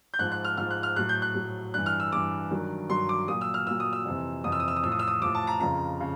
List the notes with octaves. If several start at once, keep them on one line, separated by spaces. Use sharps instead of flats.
G6
G#2 F3 F#6
F#6
F6
G#2 F3 F6
F#6
F6
A2 F#3 F#6
G6
F#6
A2 F#3
G2 E3 F#6
F6
E6
G2 E3 D6
G2 D#3 F#3
G2 D#3 F#3 C6
D6
A#2 F#3 D#6
E6
F6
A#2 F#3 E6
D#6
E6
F2 C3 E3
F2 C3 E3 D#6
E6
D#6
E6
D#6
A2 F3 E6
D#6
E6
D#6
A2 F3 D6
A5
A#5
F2 C#3 F3 A#5
C#3